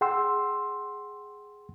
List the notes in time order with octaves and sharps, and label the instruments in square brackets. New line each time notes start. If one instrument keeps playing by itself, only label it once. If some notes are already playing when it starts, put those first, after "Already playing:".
[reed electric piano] G#4 F#5 G5 C6 E6